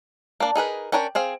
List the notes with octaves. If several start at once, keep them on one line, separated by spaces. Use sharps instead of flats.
A#3 D4
D#4 G#4 A#4 B4
C#4 D4 A#4 C#5 G5
C4 G#4 F5